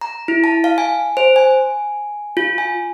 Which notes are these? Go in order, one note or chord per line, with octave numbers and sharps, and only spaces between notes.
A#5
E4
A5
F5
G#5
C5
G#5
F4
G#5